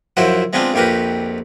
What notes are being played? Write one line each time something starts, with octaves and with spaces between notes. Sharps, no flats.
F#2 F3 E4 C5 F#5
G#3 B3 C4 D4 F4
A#1 F2 G4 A#4 B4